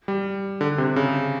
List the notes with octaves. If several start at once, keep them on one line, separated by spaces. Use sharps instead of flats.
G3
D3
C3
C#3